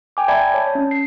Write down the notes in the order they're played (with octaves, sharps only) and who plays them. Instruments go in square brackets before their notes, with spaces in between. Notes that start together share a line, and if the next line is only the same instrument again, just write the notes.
[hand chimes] G5 G#5 D6
D5 E5 A5 B5 G#6
C#5 A5
C#4
C7